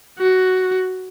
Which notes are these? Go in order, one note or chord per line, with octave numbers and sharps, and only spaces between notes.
F#4